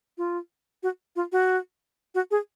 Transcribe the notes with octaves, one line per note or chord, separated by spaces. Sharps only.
F4
F#4
F4
F#4
F#4
G#4